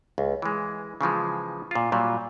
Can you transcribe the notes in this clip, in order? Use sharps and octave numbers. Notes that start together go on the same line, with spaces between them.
C#2
E3 G#3
C#3 E3 F3 G#3
A#2 F4
A#2 F#3 G3